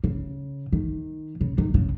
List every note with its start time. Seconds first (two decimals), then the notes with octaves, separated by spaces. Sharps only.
0.04 C#3
0.73 D#3
1.41 C#3
1.58 D#3
1.74 C#3